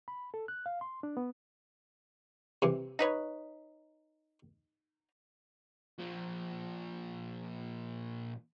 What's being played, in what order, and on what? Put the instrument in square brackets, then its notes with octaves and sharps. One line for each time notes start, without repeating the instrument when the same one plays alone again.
[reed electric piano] B5
A4
F#6
F5
C6
D4
B3
[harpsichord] C3 E3
[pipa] D#4 B4 C#5
[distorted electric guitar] A#2 F3